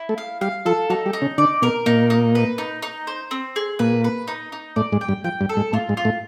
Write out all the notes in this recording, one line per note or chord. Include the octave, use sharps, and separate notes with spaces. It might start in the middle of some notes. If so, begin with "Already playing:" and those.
Already playing: E4
A3 A4
F5
G3 G4 F5
F3 F4 A4
F#3 D#4 F#4
G3 G4
D#4
C#3 C#4
D3 D4 D5
B2 B3 A#4
A#2 A#3 D#4
D#4
B4
D#4
D#4
C5
C4
G#4
A#2 A#3 B4
B4
D#4
D#4
A2 A3 D5
G#2 G#3
G5
G2 G3
F3 G5
G2 G3
A4
G#2 G#3
A2 A3 F4
G#2 G#3
F4
A2 A3